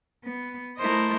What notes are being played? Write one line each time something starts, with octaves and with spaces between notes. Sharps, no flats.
B3
A3 E4 A#4 C5 D#5